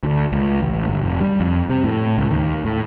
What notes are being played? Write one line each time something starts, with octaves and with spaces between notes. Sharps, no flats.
D2
C#2
A1
G1
F1
G3
F2
C3
A2
C#2
D#2
A2